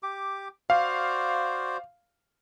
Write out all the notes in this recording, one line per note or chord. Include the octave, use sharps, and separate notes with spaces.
G4 D6
F#4 C5 D5 F5